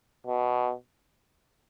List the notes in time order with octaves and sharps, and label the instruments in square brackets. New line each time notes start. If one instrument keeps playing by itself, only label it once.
[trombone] B2